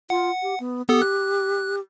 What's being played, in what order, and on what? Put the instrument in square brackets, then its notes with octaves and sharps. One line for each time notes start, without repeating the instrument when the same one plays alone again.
[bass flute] F4 [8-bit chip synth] F#5
[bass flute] G4
B3
[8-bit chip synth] B3 A4 D#6 [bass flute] G4
[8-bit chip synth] F#6